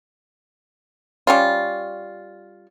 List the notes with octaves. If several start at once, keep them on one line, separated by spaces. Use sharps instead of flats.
G3 C#4 F4